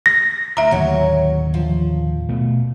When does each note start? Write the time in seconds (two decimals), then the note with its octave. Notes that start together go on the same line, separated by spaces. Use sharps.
0.06 A#6
0.57 D2 E4 E5 A#5
0.71 D#2 A2 D3 F#3 C#5
1.54 F3
2.29 B2 A3